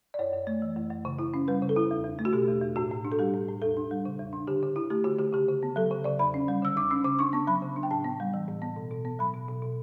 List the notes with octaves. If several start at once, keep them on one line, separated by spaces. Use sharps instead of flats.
D5
F#2 C#5
F#2
A3
E3
F#2
F#2
C#3
E4
C#4
G3 B4
C#3
A4
E4
E2
E2
A3
F#4
B2 G4
E2
E2
A2 F#4
A2
D4
A4
G3 G4
A2
A2
E2 A4
D4
G3
C#3
E2
D4
D3 G4
D3
E4
A3 G4
D3 F#4
D3 G4
C#3 G4
C#3
B3
F#3 A4
C#3
C#3 D5
E2 B5
C#4
G3
D3 E6
E2 D6
C#4 E6
C#3 D6
D4 C#6
B3 C#6
F#3 B5
C#3
D4
G5
A2 A5
B3
G3
E3
A2
B3
B2
B2
B3
F#3 B5
B2
B2
B2